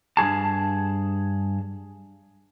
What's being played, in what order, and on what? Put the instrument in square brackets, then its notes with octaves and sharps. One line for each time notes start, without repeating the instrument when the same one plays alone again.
[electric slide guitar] G2 C3 G#4 A5